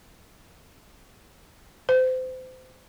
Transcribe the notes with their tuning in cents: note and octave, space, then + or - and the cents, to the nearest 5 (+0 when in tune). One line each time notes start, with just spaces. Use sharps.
C5 -30